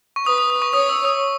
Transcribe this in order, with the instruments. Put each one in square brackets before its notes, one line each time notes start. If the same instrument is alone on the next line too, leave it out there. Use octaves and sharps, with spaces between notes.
[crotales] C#6
[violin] B4 [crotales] D#6
[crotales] D#6
D#6
C#6
[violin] C#5 [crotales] D#6
[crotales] E6
D#6